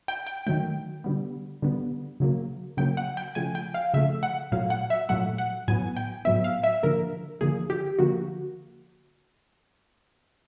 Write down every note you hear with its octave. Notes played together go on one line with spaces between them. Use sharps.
G5
G5
D#3 F#3 A3 G5
D3 G3 B3
D3 G3 B3
C#3 F#3 A#3
C#3 F#3 A#3 G5
F#5
G5
C#3 F3 A3 G#5
G5
F5
C#3 F3 A3 E5
F#5
A#2 F#3 A3 F5
F#5
E5
A#2 F#3 A3 F#5
F#5
A2 F#3 B3 G#5
G5
A2 F#3 B3 E5
F5
E5
D3 F3 A#3 A#4
D3 F3 A#3 G#4
G4
D3 F3 A#3 F#4